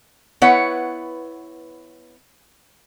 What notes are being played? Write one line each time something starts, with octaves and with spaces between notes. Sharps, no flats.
B3 E4 B4 C#5 F#5